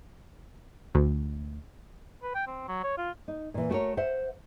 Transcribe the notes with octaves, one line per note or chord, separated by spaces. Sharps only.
D2
B4
G5
C4
F#3
C#5
F4
D#4
A#2 E3
A3 F#4 G#4 A#4 C#5
C5 E5 F#5